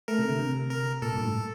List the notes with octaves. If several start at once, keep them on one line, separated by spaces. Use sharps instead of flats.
A3 A#4
C3
D3
C3
A#4
A#2 A4
G2
A2